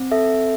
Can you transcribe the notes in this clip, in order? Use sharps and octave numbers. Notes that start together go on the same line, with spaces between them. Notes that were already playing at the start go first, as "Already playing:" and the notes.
Already playing: C4
A4 E5